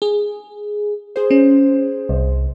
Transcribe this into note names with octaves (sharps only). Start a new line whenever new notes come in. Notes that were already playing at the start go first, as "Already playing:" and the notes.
G#4
G#4 C5
C#4
C2